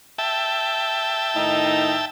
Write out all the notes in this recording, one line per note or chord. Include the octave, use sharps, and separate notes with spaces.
E5 G5 A5
A2 D#3 D#4